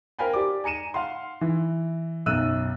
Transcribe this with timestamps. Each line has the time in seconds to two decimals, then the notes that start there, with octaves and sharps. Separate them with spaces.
0.19 A#4 C5 F5 G5 G#5 B5
0.33 G4 D5 D6
0.64 G#5 A#5 C#7 D#7 E7
0.94 F5 F#5 C6
1.41 E3
2.26 B1 F#2 E6 F#6 D#7